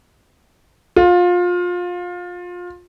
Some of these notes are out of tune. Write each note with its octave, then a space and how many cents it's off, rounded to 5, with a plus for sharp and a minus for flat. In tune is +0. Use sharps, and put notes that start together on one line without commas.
F4 +25